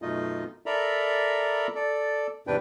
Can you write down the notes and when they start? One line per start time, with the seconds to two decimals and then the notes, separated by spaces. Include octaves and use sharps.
0.02 F#2 B2 A3 D#4 F4 D#5
0.66 A4 A#4 D5 E5 A#5 B5
1.75 A4 D5
2.47 E2 G#2 C3 D4 B4 G5